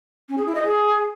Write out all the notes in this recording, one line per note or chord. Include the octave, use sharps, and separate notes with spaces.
C#4
G#4
E4
D#5
G#4